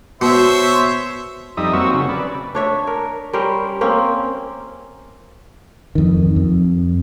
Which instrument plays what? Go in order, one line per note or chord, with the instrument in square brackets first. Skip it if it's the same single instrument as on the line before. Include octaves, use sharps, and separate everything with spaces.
[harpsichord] B2 [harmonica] C5 C#5 E5
[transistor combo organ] F2 G3 D#4 E5 D#6
F#3 A#3 C4 F#4 C#6 E6
C#3
B4 D5
[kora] D4 C#5 E5
A#4
G3 C#4 A#4 C5
A#3 C4 C#4
[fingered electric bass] F2 D#3
F2